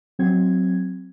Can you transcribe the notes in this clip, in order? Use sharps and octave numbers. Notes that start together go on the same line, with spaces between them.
F#3 C4 G#6